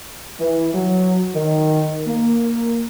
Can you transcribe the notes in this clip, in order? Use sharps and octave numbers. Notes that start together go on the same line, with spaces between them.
E3
F#3
D#3
A#3